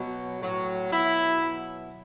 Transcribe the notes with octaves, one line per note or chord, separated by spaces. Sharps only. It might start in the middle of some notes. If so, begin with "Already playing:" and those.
Already playing: B2 F#3
A2 F#3
B2 F#3 E4
B2 F#3